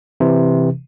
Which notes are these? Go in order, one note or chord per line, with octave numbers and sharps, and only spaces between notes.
C3 E3